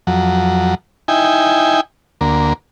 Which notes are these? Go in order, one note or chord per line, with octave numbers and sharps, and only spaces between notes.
F2 F#3
D#4 E4 G5 G#5
D2 A#3